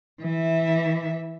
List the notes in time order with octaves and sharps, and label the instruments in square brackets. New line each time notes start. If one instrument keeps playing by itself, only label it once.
[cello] E3 E5